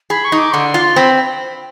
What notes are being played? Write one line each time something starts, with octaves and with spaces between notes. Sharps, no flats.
G#4 B5
C#6
D#4
D6
D3 C6
F4
C4 B5